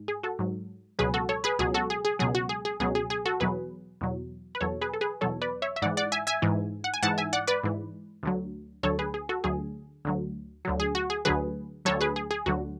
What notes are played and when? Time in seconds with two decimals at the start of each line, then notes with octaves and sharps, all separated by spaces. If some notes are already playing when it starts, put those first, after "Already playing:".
Already playing: G#2
0.08 G#4
0.23 F#4 A4
0.39 G#2 F#3
0.99 C#2 B2 F#3 G#4 B4
1.14 F#4 A4
1.29 A4 C#5
1.44 G#4 B4
1.59 C#2 B2 F#3 G#4
1.74 F#4 A4
1.90 G#4
2.05 G#4
2.19 C#2 B2 F#3 G#4
2.35 F#4
2.49 G#4
2.65 G#4
2.80 C#2 B2 F#3 G#4
2.95 G#4
3.10 G#4
3.26 F#4 A4
3.40 E2 B2 F#3 G#4 B4
4.01 E2 B2 F#3
4.55 B4
4.61 E2 B2 F#3 A4 C#5
4.81 G#4 B4
4.93 A4
5.01 G#4 B4
5.21 E2 B2 F#3 A4 C#5
5.42 B4 D5
5.62 C#5 E5
5.76 E5
5.82 G#2 E3 D5 F#5
5.97 D5 F#5
6.12 E5 G#5
6.27 E5 G#5
6.42 G#2 E3
6.84 F#5
6.94 G#5
7.03 G#2 E3 F#5 A5
7.18 E5 G#5
7.33 D5 F#5
7.47 B4 D5
7.64 G#2 E3
8.23 D2 D3 F#3
8.83 D2 D3 F#3 A4 C#5
8.99 G#4 B4
9.14 G#4
9.29 F#4 A4
9.44 D2 D3 F#3 G#4
10.05 D2 D3 F#3
10.65 D2 D3 F#3
10.80 G#4
10.95 F#4
11.10 G#4
11.25 D2 D3 F#3 G#4 B4
11.85 D2 D3 F#3 A4 C#5
12.01 G#4 B4
12.16 G#4
12.31 G#4
12.46 D2 D3 F#3 F#4